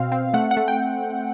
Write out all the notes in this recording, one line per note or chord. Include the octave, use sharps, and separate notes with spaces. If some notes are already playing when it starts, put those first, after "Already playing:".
Already playing: B2 C4 F5
C4
A3 F#5
F#5
A3
G5